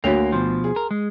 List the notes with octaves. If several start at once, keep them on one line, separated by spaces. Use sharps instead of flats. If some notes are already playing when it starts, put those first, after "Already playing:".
D2 A#3 F#4 C#5 F7
B2 F3 C6
G#4
A#4
G#3